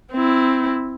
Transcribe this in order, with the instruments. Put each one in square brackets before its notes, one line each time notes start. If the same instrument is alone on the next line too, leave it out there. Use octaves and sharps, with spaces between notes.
[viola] C4 E4